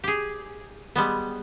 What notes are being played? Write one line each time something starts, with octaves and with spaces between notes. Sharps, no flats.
G4 G#4
G3 G#3 B3